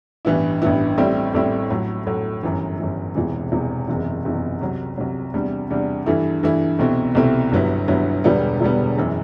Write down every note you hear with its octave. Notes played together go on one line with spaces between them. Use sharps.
A1 G2 E3 B3 E4
A1 G2 E3 B3 E4
A1 A2 G3 C4 E4
A1 A2 G3 C4 E4
A2 F#3 A3
A2 F#3 A3
G1 F#2 E3
G1 F#2 E3
E1 E2 C3 E3
E1 E2 C3 E3
F#1 E2 C3 E3
F#1 E2 C3 E3
C2 C3 F#3
C2 C3 F#3
E2 C3 G3 D4
E2 C3 G3 D4
G2 E3 A3 E4
G2 E3 A3 E4
C2 B2 A3 C4 E4
C2 B2 A3 C4 E4
G1 G2 F#3 B3 E4
G1 G2 F#3 B3 E4
E1 E2 D3 G3 B3
E1 E2 D3 G3 B3
F#1 F#2 E3